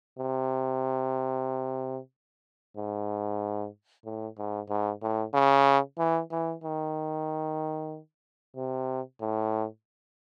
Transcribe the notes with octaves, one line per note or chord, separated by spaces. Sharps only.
C3
G#2
A2
G#2
G#2
A2
C#3
E3
E3
D#3
C3
A2